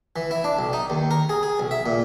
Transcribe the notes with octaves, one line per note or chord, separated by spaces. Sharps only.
E3
E4
D4
B1
D#4
D#2
A#4
G#4
G#4
B1
E5
A#2